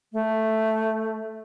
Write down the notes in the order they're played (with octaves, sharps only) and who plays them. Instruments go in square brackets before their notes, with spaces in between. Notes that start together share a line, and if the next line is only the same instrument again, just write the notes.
[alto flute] A3